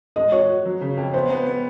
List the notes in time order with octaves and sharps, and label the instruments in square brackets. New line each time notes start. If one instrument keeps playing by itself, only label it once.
[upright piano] G#3 [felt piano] D#5
[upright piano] F#4 [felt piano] C#5
[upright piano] F#4
F#3
C#3
F2
[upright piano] B3 [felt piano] C5
[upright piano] B3
B3